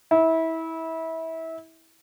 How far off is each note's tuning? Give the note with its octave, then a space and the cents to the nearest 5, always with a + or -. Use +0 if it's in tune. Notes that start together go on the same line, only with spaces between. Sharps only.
E4 -25